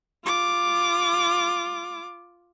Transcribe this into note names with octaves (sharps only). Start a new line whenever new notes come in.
F4 D6